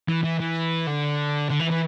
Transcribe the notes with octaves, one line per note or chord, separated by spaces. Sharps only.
E3
E3
E3
D3
D3
E3
E3